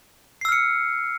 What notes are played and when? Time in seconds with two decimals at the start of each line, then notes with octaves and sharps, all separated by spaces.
0.41 C7
0.45 E6
0.49 F6
0.52 C#7